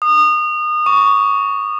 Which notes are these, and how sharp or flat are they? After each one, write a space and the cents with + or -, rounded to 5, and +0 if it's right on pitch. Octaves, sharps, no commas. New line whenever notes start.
D#6 -30
C#6 +15